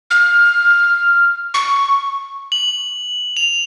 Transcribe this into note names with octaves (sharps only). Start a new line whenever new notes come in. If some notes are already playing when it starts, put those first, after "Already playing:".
F6
C#6
F#7
F7